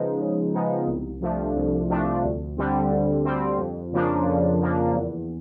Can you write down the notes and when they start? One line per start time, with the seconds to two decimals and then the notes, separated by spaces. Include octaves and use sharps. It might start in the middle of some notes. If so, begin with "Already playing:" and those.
Already playing: C#3 F3 G#3 B3 D#4
0.20 C#3
0.54 F3 G#3 B3 D#4
0.87 C2
1.21 C3 F3 A3 D4
1.56 C2
1.90 C3 F3 A3 D4
2.24 D2
2.57 D3 G3 C4
2.91 D2
3.25 D3 G3 C4
3.59 F2
3.93 C#3 F3 A#3 D4
4.27 F2
4.60 C#3 F3 A#3 D4
4.94 E2